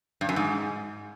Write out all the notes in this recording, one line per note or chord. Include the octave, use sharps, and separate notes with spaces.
G2
F#2
G#2